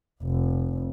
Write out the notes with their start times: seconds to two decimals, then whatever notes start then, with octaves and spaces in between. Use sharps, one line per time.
0.24 F1